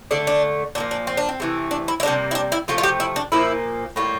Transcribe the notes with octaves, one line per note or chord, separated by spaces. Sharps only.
D3 A3 D4
D4
A#2 F3 A#3 D4
D4
C4
D4
C4
C3 E3 A3
D4
E4
E4
C3 G3 A#3 D4
E4
D4
E4
C3 F3 A3 F4
F4
G4
E4
D4
A#2 F3 A#3 E4
A2 G3 A#3 F4